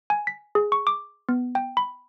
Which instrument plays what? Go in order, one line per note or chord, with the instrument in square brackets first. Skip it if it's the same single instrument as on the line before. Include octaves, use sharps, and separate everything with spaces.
[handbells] G#5
B6
G#4
C#6
D6
B3
G5
B5